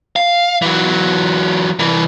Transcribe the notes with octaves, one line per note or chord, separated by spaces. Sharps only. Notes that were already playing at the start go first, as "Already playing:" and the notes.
F5
E3 F#3
C2 E3